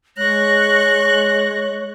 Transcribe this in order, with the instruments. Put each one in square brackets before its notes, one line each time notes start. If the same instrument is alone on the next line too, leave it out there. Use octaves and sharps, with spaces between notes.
[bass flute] G#3 [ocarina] C#5 [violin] C#6 F#6 [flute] A#6